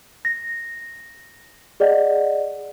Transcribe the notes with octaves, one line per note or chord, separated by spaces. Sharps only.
A#6
G#4 D5 D#5 F#5